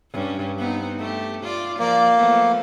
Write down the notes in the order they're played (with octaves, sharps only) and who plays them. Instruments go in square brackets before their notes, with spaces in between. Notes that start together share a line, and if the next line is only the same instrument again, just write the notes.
[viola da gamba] G2 C#4
B3 C4 D#4
A3 G4
F4 D5
[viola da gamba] F3 D5 [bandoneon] A#3
[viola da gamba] F3 A3 B3